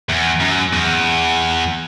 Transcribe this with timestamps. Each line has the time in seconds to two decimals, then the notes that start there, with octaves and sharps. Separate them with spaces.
0.09 E2
0.40 F#2
0.73 E2